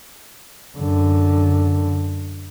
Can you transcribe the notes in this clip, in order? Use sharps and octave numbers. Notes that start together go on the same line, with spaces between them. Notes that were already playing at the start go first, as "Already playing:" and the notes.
F#2 D3